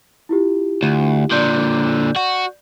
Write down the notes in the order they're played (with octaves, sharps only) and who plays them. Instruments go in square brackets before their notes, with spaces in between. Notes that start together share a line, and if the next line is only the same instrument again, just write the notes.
[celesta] E4 F4 G4
[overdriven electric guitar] D2
[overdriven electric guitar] A#2 D3 [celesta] D5 G6
[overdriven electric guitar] F#4